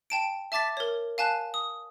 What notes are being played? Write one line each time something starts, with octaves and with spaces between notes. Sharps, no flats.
G5 A5 D7
E5 A5 D6 A6 B6
A#4 C#5
F5 G#5 A5 F#6
D#6